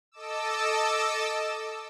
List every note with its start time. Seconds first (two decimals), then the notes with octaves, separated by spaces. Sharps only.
0.12 A4 D#5 A5 D6 E6